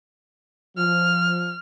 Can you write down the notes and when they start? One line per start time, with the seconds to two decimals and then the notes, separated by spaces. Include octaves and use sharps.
0.78 F3 F6